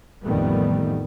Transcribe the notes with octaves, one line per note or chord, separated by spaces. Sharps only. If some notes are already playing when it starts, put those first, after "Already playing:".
A1 F2 D#3 G3 A3 B3